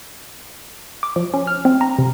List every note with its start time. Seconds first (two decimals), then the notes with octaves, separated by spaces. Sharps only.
1.03 D6
1.16 F3
1.34 C#4
1.47 F6
1.65 C4
1.81 A#5
1.99 C3